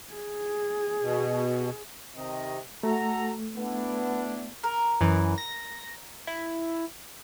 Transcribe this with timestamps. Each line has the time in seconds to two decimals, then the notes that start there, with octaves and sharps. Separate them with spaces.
0.13 G#4
1.02 B2
2.16 C3 D#3 D#5
2.83 A3 F#4 A4 A#5
3.57 B3 D4 E4
4.64 A#4
5.01 F#2 E3
5.38 A#6
6.27 E4